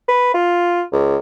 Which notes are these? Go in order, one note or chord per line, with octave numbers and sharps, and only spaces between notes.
B4
F4
C#2